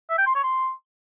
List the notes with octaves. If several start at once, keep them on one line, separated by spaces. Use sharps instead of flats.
E5
G5
C6
C#5
C6